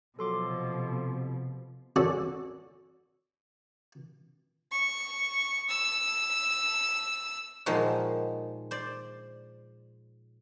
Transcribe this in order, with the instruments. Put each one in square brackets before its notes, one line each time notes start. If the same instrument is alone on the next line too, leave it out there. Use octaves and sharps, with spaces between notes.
[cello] B2 F3 [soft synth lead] F#3 [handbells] A4 C6 D6
[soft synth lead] C3
[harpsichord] C#4 F#4 A4 D5
[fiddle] C#6
E6
[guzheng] A#2 D#3 F3 G#3 A#3 F#4
C5 D5